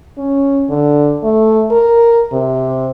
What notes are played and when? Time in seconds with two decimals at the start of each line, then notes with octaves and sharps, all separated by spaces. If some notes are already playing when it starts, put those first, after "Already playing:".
0.17 C#4
0.69 D3
1.23 A3
1.71 A#4
2.32 C3